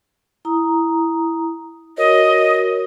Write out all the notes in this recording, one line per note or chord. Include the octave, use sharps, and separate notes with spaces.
E4 A#5 D#6
F#4 A#4 C#5 D#5